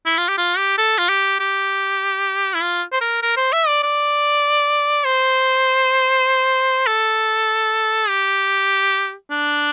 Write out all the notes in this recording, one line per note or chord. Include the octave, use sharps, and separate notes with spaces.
E4
F4
G4
F4
G4
A4
F4
G4
G4
E4
F4
C5
A#4
A#4
C5
E5
D5
D5
C5
A4
G4
D4